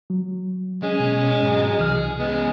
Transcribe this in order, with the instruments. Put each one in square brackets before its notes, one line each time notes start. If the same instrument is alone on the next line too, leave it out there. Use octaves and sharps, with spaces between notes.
[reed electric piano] F#3
[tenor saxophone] G#3 [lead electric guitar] C#4
[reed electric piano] B2
[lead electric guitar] G#2 F#3
[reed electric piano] C2 E3 F6 [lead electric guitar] G#4
[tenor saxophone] G#3 [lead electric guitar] B3 C#4